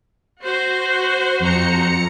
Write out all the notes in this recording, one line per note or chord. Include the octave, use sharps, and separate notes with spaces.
F#4 C5
F2 A#5 C#7